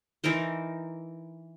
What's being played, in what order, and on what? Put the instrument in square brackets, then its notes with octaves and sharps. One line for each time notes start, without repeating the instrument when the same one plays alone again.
[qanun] E3 D#4 A#4 C5